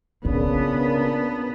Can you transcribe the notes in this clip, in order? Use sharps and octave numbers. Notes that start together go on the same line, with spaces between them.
A#2 C#3 B3 D4 F4 A#4